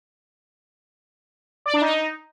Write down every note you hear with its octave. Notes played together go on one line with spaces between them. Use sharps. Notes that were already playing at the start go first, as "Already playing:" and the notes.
D5
D4
D#4